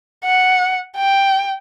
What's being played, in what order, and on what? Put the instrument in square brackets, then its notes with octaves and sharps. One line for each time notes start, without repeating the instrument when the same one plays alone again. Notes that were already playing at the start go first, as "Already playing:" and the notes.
[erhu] F#5
G5